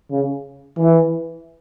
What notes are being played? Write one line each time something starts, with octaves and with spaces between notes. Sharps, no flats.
C#3
E3